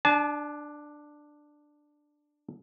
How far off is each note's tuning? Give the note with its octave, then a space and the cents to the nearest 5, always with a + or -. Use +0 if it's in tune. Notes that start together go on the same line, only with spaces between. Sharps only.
D4 +10 A5 -35